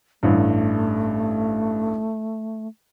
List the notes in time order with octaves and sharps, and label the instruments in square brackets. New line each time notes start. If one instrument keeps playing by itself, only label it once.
[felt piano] A1 G2 [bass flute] A3